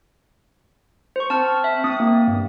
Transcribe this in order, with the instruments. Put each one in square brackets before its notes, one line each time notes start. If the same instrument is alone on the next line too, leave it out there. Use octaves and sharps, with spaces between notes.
[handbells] C5 C#6
[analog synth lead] C4 [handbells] A5 F6
[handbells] E5
[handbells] C4 [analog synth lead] D#6
[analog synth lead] A#3
G2